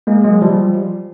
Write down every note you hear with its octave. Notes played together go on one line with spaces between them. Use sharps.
G#3 A#3
F#3 G#3
F3 G3